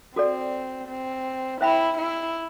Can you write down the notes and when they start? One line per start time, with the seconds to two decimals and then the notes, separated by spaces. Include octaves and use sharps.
0.16 C4 F#4 A4 D5
0.89 C4
1.61 E4 C5 E5 G5 B5
1.97 E4